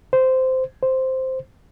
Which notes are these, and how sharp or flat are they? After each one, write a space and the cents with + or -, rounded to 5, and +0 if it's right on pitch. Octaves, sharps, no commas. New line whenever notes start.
C5 -10
C5 +0